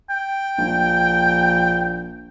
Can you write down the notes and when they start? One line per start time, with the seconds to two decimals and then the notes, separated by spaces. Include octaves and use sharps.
0.10 G5
0.58 A#1